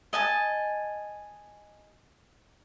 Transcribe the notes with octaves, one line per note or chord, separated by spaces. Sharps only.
D#5 G#5 A5